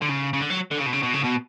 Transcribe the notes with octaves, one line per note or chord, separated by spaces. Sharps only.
D3
C#3
C#3
D3
F#3
D3
C#3
B2
C#3
B2
C#3
B2